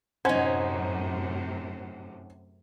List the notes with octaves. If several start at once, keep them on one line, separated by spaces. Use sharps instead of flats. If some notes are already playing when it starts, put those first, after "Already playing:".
F#2 A2 C3 C#4 D#4 C5 F#5 G#6